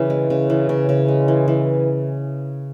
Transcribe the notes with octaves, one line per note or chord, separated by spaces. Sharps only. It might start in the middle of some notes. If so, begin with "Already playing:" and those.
Already playing: C#3 E3
G#3
C#3
E3
C#3
C#3
G#3
E3
E3